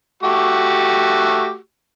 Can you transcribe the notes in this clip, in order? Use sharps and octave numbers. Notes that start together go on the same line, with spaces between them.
A3 F#4 G4